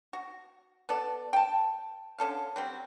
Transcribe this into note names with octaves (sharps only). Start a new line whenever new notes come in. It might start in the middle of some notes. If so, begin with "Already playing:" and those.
F#4
B3 A4 D5
G5 A5
D3 C#4 A4 F5
F#3 G3 C4